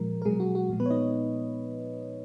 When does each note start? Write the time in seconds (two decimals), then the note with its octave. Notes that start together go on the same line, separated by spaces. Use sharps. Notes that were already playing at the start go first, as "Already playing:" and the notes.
Already playing: A#2 F3 G#3 A#4
0.22 A#4
0.25 B2 F#3 G#3 G#4
0.40 F#4
0.55 F#4
0.70 A#2 F3 G#3
0.80 B3 B4
0.86 C#5
0.90 D#4 D#5